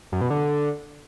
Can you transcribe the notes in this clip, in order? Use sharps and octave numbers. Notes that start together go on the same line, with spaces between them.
F#2
B2
D3